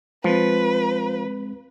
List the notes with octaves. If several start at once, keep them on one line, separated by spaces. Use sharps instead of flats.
F3 G#3 C4 B4